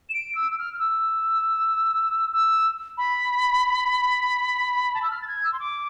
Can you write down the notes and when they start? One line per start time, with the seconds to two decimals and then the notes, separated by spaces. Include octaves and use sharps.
0.09 E7
0.14 D7
0.35 E6
0.51 E6
0.58 F6
0.73 F6
0.79 E6
2.33 E6
2.97 B5
4.94 A5
5.02 E6
5.10 F6
5.22 A6
5.27 G#6
5.43 E6
5.52 C6
5.59 D6